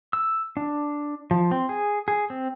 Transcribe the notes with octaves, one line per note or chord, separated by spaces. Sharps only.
E6
D4
F3
C4
G#4
G#4
C4